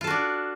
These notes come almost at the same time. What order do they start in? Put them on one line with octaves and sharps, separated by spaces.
F4 A4 F#4 D4